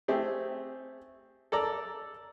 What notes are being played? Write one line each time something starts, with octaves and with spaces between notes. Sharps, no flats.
A3 C4 G4 G#4
A4 A#4 D5 A#5